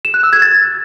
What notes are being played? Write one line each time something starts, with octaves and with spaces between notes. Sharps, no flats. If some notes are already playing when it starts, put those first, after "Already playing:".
E7
F#6
E6
G#6
A6